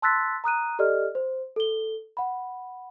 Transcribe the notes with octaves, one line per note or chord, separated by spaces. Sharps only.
A5 C6 E6 F#6 A6 B6
A#5 D#6 F#6 D#7
G4 A4 D5 D#5 F6
C5
A4 G7
F#5 B5